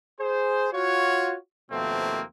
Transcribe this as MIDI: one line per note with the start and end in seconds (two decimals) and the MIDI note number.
0.20 0.68 68
0.20 0.68 72
0.73 1.36 65
0.73 1.36 66
0.73 1.36 73
1.71 2.22 39
1.71 2.22 47
1.71 2.22 53
1.71 2.22 57
1.71 2.22 58
1.71 2.22 60